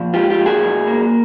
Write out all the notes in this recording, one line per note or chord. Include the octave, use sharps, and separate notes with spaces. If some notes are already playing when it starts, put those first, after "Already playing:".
Already playing: A#2 F3
G#3 F4 G4
F4 G4
A#2
F#4 G#4
F#3
A#3